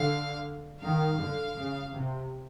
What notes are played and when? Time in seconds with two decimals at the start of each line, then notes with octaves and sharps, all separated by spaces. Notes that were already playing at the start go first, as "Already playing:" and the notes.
Already playing: D3 F5
0.80 D#3 F5
1.17 D3
1.55 C#3
1.92 C3